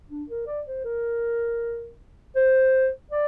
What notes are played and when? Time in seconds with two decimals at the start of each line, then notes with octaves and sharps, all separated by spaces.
0.11 D4
0.30 A#4
0.47 D5
0.67 C5
0.85 A#4
2.36 C5
3.12 D5